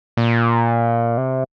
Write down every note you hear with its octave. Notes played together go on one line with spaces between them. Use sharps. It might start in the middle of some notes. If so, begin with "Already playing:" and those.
A#2
C3